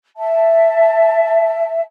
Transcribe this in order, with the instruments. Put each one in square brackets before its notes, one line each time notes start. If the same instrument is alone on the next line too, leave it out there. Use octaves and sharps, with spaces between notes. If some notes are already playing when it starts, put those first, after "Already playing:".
[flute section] E5 A5